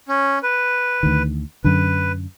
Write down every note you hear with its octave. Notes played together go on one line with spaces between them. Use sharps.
C#4
B4
D2 D#3
F#2 D3 B4